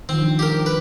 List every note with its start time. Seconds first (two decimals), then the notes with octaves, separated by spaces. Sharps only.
0.09 D#3 F3 C4
0.21 F3 D4
0.39 G4 A#4
0.66 B4